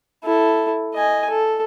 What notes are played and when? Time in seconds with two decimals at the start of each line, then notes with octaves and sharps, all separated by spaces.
0.24 E4 A4
0.95 D#5 G#5
1.30 A4